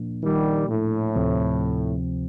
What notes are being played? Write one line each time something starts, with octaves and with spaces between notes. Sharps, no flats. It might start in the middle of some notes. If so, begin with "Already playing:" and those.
Already playing: A#2 F3 A#3 D4
D#3 G3
A2
D2 C3 F3 C4